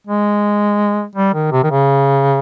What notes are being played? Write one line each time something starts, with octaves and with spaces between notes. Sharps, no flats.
G#3
G3
D#3
C3
D#3
C#3